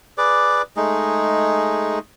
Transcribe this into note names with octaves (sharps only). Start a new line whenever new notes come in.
G#4 B4 D5 D6
G#3 A3 D#4 G#4